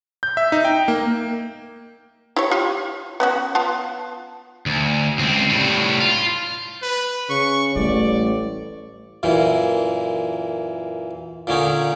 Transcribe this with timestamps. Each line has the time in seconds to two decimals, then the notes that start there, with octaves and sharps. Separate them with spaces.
0.23 G6
0.37 E5
0.52 D#4
0.65 G5
0.88 A#3
2.36 E4 G4 C#5
2.51 F4 G4
3.20 B3 C#4 F#4
3.55 B3 F4 A5
4.66 D2
5.18 C#2 C4
5.50 A2 G3
6.00 F4
6.82 B4
7.30 C#3 C#6
7.76 A1 G3 A3 D5
9.23 F#2 A#2 E3
11.47 A#2 D3 C#4 D#4